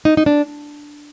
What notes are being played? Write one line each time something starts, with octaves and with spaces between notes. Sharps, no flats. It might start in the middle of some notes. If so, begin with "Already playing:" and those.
D#4
D#4
D4